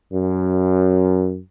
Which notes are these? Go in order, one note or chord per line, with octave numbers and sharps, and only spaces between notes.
F#2